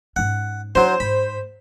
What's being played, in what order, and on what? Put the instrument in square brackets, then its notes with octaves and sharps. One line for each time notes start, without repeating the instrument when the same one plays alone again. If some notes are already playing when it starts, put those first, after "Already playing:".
[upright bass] G#2 C#4 [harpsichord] F#5
[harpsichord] F#3 C6 [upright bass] D4 E4 [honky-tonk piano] C5
[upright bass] G#2 [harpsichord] B5